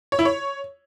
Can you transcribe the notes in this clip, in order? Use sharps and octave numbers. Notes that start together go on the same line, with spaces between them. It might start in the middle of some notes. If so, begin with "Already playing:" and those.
C#5
E4
C#5